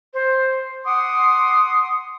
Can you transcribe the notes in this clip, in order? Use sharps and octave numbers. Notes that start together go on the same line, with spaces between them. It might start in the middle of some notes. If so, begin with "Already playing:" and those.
C5
F#5 C6 D6 D#6